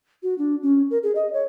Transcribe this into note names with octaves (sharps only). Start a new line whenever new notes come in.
F#4
D4
C#4
A#4
G#4
D#5
C#5